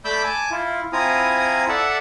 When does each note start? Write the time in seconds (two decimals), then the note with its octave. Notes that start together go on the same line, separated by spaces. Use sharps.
0.05 A3 D5 B5 D6 E6 G6
0.24 G#5 A5 D6
0.51 E4 F4
0.93 C4 E4 F4 G#5 A#5 D#6
1.69 A4 D5 E5 F#5 A5